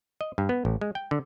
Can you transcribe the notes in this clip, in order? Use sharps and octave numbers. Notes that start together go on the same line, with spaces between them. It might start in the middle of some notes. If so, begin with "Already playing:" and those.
D#5
G2
B3
A1
G#3
G5
D3